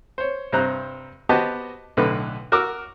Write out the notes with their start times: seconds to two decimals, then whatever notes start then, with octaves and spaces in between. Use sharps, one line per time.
0.18 C5 C#5
0.52 G2 C3 C4 C5 A#5 F#6
1.29 B3 F#4 G4 C5 D#5 A5
1.97 B1 A2 D3 B4 B5
2.52 F#4 A#4 F#5 D6 E6